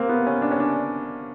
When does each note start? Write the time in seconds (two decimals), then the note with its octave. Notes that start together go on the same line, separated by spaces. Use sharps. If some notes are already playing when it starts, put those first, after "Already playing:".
Already playing: A#3 C4
0.09 B3
0.27 C#4
0.42 D4
0.52 C#4
0.60 D4